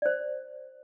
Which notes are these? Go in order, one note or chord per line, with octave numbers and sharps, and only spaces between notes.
C5 D5